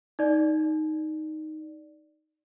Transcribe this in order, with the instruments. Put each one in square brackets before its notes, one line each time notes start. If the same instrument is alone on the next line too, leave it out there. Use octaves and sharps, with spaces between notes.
[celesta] D#4 D5